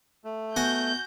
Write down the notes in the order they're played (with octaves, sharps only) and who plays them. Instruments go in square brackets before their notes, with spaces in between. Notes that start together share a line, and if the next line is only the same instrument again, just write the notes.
[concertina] A3
[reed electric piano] B3 [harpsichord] F#4 G#5 [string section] G6